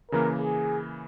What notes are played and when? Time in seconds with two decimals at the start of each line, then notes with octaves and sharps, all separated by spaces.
0.11 C#3 E3 A#3 A#4
0.40 G#4